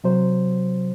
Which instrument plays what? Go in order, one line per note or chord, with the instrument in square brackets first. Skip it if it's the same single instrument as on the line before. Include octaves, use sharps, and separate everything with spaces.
[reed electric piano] C3 F#3 C5